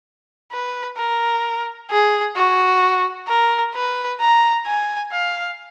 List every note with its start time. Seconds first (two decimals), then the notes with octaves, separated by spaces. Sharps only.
0.52 B4
0.97 A#4
1.91 G#4
2.36 F#4
3.28 A#4
3.75 B4
4.21 A#5
4.66 G#5
5.12 F5